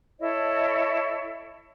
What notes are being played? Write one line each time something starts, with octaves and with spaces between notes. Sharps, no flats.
E4 A4 C#5 D#5